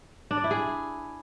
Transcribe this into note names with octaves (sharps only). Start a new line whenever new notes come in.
D4
D5
E4
G#4